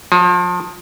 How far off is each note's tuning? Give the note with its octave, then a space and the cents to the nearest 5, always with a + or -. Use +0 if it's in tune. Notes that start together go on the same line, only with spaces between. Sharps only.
F3 +35